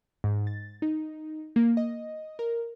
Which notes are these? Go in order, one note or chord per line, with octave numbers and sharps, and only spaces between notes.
G#2
A6
D#4
A#3
D#5
A#4